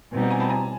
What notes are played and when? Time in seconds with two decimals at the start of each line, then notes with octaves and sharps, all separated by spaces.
0.12 B2 G3 C4 D#4
0.30 G#5 A#5
0.40 A5 B5
0.49 G#5 A#5